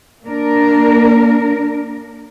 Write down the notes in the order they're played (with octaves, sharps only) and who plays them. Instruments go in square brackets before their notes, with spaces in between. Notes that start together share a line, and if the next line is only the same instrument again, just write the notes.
[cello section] A#3 D4 A#4